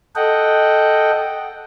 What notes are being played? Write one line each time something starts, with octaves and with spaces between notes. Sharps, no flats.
A4 D#5 F#5 G5